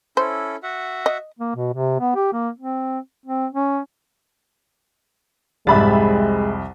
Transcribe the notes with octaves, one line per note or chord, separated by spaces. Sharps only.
C#4 E4 A4 C5
F#4 E5 F#5
D#5
A#3
B2
C3
B3
G4
A#3
C4
C4
C#4
C2 F2 G#2 G3 G#3 E5 B5 A6